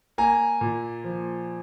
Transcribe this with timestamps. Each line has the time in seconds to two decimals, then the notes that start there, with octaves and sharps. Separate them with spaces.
0.18 A#3 G#5 A#5
0.61 A#2
1.04 F3